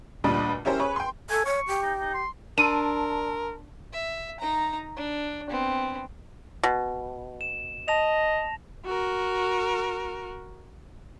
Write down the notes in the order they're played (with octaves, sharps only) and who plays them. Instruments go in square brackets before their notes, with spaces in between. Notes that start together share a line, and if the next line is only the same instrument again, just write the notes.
[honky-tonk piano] D2 A#2 G3 D4 B4 D#5
C#4 E4 G4 A#4 C5
G#4 B4 C#5
G5 C6
[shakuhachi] A4 [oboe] G#5
[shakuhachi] C#5 [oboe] C#6
[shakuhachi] G4
[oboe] D#4
D#4
C6
[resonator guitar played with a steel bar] D4 [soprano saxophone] A#4 [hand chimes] A5 C6 E6 [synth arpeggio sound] D#7
[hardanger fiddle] E5
D#4 A#5
D4
B3 C4
[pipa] B2
[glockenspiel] E7
[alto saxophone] D#5 [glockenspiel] A5 A#6 F7
[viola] F#4 A#4